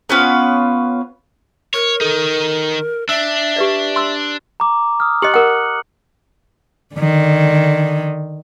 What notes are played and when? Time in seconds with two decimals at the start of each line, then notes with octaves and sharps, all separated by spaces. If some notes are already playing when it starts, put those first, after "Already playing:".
0.09 B3 C#4 F4 B4
1.74 A#4 C#5
2.01 D#3 D#4 A4
3.09 D4 E5 E6
3.56 G4 B4 D5
3.96 C6 E6
4.60 A#5 D6
5.00 D#6 F6
5.22 G4 D#5 F#6 C#7 F#7
5.34 A#4 F#5 C#7
6.95 D3 D#3